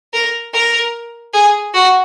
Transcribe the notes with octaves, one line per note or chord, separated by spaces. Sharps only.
A#4
A#4
G#4
F#4